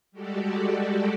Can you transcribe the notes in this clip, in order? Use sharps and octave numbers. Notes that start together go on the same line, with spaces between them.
G3 G#3 F#4 G4 A4 D5